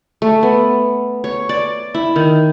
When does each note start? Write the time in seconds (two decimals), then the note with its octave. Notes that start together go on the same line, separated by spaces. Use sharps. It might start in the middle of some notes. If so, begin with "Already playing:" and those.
0.22 A3
0.43 B3
1.24 C#5
1.49 D5
1.94 E4
2.16 D#3